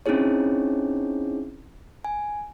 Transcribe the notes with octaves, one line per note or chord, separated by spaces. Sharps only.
C4 C#4 D#4 E4 G#4 C#5
G#5